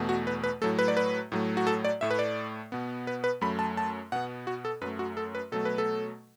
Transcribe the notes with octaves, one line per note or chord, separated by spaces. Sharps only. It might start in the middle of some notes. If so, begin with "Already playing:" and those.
Already playing: E2 B2 A3
F#4
B4
B4
A2 F#3 A3 A4
B4
D5
B4
A2 F#3 A3
F#4
A4
D5
A2 A3 E5
B4
D5
B2 B3
B4
B4
F#2 F#3 A3 B5
A5
A5
B2 B3 F#5
F#4
A4
F#2 F#3 A3 B4
F#4
A4
B4
B2 F#3 A3 A4
B4
A4